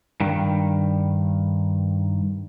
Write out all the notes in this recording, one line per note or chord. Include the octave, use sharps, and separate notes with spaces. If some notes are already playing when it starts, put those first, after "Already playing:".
G2 D#3